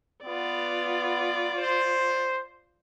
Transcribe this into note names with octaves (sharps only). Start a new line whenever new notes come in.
B3 F4 D5
C5